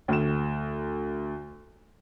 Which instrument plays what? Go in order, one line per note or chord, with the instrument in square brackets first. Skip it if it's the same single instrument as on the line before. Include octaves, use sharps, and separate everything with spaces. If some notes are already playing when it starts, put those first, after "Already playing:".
[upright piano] D2 E7